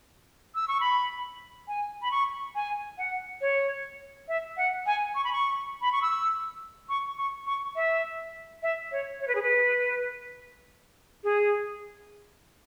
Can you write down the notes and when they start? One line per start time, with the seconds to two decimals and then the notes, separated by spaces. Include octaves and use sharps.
0.55 E6
0.68 C#6
0.81 B5
1.68 G#5
2.02 B5
2.11 C#6
2.55 G#5
2.98 F#5
3.41 C#5
4.28 E5
4.57 F#5
4.86 G#5
5.15 C#6
5.24 B5
5.33 C#6
5.82 B5
5.92 C#6
6.02 E6
6.89 C#6
7.18 C#6
7.47 C#6
7.76 E5
8.63 E5
8.92 C#5
9.20 C#5
9.28 B4
9.35 G#4
9.42 B4
11.24 G#4